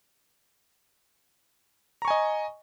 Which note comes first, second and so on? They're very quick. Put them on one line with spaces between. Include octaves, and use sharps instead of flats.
A#5 C#6 G#5 D#5